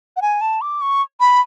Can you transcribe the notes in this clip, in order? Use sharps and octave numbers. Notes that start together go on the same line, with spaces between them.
F#5
G#5
A5
D6
C#6
B5